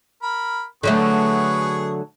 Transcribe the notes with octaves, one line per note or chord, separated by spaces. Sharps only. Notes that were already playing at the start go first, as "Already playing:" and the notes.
A#4 B5
D3 F#3 A3 B3 G#4 C#6